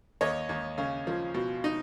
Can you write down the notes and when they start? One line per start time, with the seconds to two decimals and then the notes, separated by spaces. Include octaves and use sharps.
0.21 D#2 C#5 D#5
0.49 D#2
0.78 C#3
1.07 F3
1.34 B2
1.64 D#4